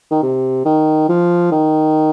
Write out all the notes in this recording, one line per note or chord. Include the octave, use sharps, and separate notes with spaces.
D#3
C3
D#3
F3
D#3